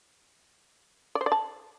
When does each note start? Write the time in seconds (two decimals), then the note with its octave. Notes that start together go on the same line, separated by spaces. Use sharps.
1.15 D5
1.21 C5
1.26 D5
1.32 A5